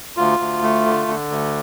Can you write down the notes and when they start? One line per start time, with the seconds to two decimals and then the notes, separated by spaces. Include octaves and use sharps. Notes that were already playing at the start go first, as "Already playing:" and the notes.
0.17 D2 F4
0.39 D2
0.62 A3
0.85 D3
1.08 D3
1.30 D2